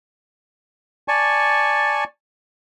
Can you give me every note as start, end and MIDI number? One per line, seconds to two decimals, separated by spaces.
1.08 2.04 74
1.08 2.04 80
1.08 2.04 81
1.08 2.04 85